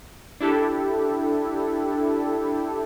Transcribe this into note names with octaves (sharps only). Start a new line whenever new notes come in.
D4 E4 G4 A4